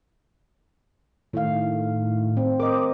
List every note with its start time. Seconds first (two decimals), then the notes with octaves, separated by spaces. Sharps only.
1.33 A2 D#3 A3 F5
2.37 C4
2.60 A#4 C5 D#5 D6